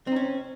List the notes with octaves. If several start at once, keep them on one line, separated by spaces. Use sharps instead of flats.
C4 C#4 D#4